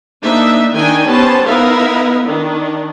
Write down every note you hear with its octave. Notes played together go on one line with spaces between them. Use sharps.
A#3 D4 D#4 E5
D#3 D4 D#4 G5 G#5
B3 C#4 G4 C5 A5
B3 D#4 E4 A#4 E5 F5
D#3 D4